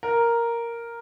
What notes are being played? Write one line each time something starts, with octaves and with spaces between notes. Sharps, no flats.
A#4